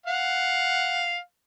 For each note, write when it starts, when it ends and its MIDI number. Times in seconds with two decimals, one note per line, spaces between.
0.06 1.16 77
0.06 1.16 78